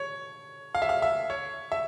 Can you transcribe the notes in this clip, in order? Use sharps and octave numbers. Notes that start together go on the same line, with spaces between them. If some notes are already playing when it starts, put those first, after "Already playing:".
Already playing: C#5
F5
E5
F5
E5
C#5
E5